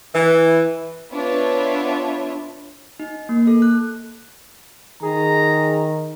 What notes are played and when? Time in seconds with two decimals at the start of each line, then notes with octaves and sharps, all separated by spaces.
0.13 E3
1.12 B3 D4 F4 C#5 E5
3.00 D#4
3.29 A#3
3.47 A4
3.62 F#6
5.03 D#3 G#4 A#5